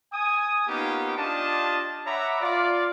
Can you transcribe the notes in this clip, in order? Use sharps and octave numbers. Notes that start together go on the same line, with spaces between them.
G#5 D#6
A#3 B3 C#4 D#4 F4 G4
D4 F4 G4 D#5 A5
C#5 E5 F#5 A#5 B5 D6
F4 D5